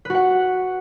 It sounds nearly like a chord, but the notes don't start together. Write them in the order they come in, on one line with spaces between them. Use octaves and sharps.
B4 F#4 F#5